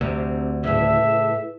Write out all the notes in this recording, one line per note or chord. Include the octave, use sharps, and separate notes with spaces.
D2 C3
A2 C#3 E4 G#4 B4 E5